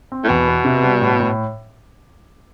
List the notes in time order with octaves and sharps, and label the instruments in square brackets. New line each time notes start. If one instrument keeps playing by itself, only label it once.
[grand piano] C4
[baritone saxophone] A2
[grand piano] E2 [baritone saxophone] B2
[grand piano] B3
C3
G3
A2
A2